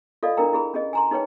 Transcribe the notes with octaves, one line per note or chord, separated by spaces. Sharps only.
F4 A4 D5 D#5 F5
D4 E4 A#4 G5 A#5
E4 G#4 B5
C#4 G#4 D#5
G#5 A#5 C6
D#4 G#4 B4 C#5 G5